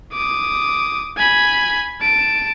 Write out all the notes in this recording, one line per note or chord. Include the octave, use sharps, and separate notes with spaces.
D6 D#6
G#5 B5
A5 D7